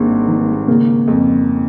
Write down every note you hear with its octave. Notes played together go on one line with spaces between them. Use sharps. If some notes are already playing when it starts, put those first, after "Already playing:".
Already playing: G#1 G2 G#3 A#3
D#3
C#3 A#3
F2